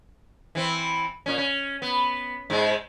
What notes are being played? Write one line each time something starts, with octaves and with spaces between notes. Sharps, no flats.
E3 C4
A#2 C#4
C#4
B3
G#2 G#3